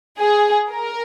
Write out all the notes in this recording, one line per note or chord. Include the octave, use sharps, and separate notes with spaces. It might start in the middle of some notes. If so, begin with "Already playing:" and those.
G#4
A#4